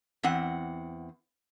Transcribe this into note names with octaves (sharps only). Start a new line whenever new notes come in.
E2 C4 F#5